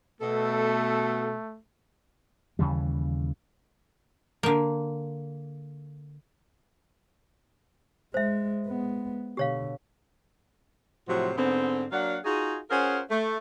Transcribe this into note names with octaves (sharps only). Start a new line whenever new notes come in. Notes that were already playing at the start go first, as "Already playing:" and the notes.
B2 A3 A4
D#2 C#3 E3 G3
D3 A#3
G#3 C5 E5
G#3 B3
B2 D3 G4 C#5 F5
A2 C3 F3 F#3 F#4
G#2 D3 B3 C4
F#3 A#3 D4 F5 F#5
D#4 F4 F#4 G#4
C#4 F4 G#4 A#4 C5 F#5
A3